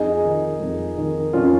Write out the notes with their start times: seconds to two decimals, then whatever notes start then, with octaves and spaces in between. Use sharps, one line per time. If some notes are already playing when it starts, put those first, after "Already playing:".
Already playing: F2 D#4 G#4
0.24 D#3
0.60 F2
0.97 D#3
1.33 F2 C#4 F4